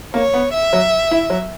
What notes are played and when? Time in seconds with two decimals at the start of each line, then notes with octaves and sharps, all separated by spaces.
0.14 A#3 C#5
0.34 B3
0.53 E5
0.73 F#3
1.11 E4
1.30 F#3